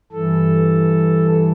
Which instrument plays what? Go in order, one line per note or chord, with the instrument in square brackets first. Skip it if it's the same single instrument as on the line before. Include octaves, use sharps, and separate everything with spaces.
[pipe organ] G2 E3 A4